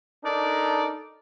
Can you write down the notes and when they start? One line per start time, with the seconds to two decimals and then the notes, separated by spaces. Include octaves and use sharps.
0.24 D4 D#4 A4 A#4 D5